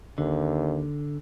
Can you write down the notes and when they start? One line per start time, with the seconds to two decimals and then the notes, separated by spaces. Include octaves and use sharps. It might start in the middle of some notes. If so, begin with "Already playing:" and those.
0.18 D#2 D3